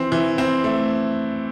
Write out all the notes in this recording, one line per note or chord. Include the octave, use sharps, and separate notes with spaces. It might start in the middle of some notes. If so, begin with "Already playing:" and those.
Already playing: E3 C4
E3
C4
A3